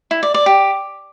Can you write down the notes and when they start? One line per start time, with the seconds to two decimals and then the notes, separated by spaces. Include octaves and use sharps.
0.11 E4
0.23 D5
0.34 D5
0.46 G4